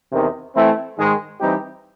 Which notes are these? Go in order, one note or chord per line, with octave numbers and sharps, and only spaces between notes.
E2 C3 D#3
E3 A3 C4 E4
G#2 D#3 G#3
E3 G3 C4 D#4 G4